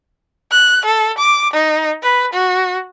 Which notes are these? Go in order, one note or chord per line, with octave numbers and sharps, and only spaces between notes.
F#6
A4
D6
D#4
B4
F#4